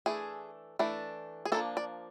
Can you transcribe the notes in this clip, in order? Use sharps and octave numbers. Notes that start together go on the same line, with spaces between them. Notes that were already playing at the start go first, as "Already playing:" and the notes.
E3 A3 D4 G#4
E3 A3 D4
G#4
F3 A#3 D4 A4
D5